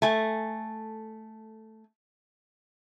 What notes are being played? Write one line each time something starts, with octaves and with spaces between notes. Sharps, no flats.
A3 G#5